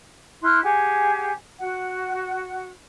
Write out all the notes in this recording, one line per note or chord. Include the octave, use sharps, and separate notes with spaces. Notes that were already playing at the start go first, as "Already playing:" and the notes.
E4 C6 F6 F#6
G4 G#4 F#5 G#5
F#4 F#5